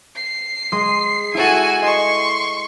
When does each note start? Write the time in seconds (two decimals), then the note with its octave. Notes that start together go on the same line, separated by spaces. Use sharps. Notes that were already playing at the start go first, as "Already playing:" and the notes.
0.16 C7
0.72 G#3 C6 D#6
1.34 E4 F#4 A4 G#5
1.82 D#5 C6 C#6